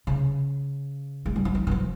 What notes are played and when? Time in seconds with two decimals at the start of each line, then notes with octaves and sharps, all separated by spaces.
0.07 C#3
1.26 G#3
1.36 G3
1.45 F3
1.55 E3
1.67 E3
1.71 F3